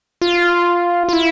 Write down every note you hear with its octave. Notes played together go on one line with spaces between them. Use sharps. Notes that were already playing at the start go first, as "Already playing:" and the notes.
F4
F4
E4